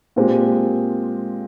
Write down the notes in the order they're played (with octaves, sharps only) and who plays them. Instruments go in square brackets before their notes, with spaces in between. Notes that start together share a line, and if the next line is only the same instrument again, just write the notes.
[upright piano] A#2 G#3 C4 G4